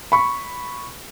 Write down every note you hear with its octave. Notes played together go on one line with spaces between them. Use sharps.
B5 C#6